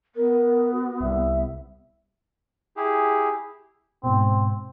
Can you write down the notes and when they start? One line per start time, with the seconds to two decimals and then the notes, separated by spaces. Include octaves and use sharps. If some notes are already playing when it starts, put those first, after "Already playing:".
0.15 B3 A#4
0.72 F#4
1.01 C2 E5
2.77 E4 G4 G#4
4.03 G#2 B2 C4